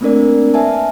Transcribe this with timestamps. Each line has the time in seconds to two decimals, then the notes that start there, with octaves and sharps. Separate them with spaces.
0.01 A3 A#3 C4 D4 A#4 D5
0.54 B4 E5 G#5 A5